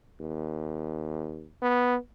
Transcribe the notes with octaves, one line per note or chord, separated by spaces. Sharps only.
D#2
B3